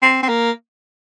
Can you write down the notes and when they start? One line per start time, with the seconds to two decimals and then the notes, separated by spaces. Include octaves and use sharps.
0.02 C4
0.23 C4
0.28 A#3